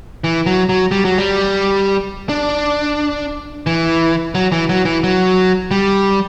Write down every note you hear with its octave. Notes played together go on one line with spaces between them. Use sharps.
E3
F#3
F#3
G3
F#3
G3
D4
E3
F#3
E3
F#3
E3
F#3
G3